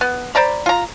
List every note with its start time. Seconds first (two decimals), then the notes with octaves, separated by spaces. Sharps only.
0.01 B3
0.35 C5 D5 A#5 B5
0.66 F4 A#5